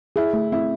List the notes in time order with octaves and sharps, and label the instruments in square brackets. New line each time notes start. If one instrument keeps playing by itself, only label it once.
[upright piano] E4 [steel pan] G#4
[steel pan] A3
[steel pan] C4 [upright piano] E4